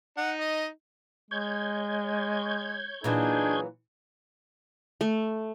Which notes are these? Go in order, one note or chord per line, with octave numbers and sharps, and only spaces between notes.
D#4 F#5
D#5
G#3 C#5 G6 G#6
A#2 E3 F#3 D4 D#4 G#4
A3